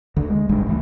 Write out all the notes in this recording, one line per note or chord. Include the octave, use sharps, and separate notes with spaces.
D#2 D3
G#3
D#1 A1 G2 G#3
C#2 E3 A3